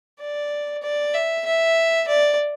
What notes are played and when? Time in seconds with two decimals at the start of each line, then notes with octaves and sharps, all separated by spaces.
0.20 D5
0.83 D5
1.14 E5
1.45 E5
2.08 D5